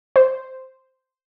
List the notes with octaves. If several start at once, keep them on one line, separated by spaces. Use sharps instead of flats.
C5